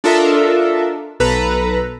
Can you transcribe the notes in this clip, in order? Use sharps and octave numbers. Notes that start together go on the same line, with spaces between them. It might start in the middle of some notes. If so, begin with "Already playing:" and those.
D4 F4 A4 A#4 D#5 E5
B1 A4 B4 A#5